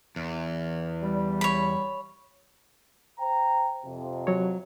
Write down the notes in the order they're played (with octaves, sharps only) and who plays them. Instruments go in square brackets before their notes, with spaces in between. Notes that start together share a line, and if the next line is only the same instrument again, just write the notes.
[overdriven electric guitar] E2
[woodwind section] G3
[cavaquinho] C#5 B5
[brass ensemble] C5 G5 A#5
F2 C3
[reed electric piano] F#3 C#5